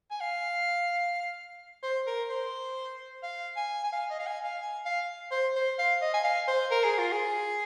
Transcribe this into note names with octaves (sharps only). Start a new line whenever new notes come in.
G#5
F5
C5
A#4
C5
F5
G#5
G#5
F5
D#5
F5
G#5
F5
G#5
F5
C5
C5
F5
D#5
G#5
F5
C5
A#4
G#4
F4
G#4